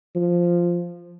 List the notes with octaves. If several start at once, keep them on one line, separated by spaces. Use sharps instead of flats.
F3